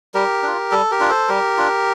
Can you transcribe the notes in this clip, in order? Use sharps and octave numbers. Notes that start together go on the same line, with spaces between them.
G3 G4 A#4
D4 F4
G3 A4
G4 A#4
D4 F4
A4 C5
G3 G4 A#4
D4 F4